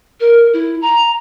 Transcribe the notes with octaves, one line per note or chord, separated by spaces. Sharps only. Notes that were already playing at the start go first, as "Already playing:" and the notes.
A#4
E4
A#5